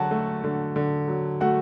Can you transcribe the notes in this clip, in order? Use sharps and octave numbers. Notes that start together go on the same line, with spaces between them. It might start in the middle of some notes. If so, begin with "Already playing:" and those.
Already playing: D3 F#3 F#4 F#5 A5
A3
D3
D3
F#3
A3 F#4 F#5